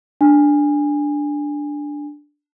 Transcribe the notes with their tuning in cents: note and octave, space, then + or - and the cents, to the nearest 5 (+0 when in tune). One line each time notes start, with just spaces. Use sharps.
D4 +0 G#5 -20